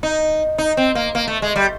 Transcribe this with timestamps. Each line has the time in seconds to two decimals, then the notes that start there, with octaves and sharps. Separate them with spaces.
0.03 D#4
0.58 D#4
0.77 C4
0.95 A#3
1.15 A#3
1.28 A3
1.42 G#3
1.56 G3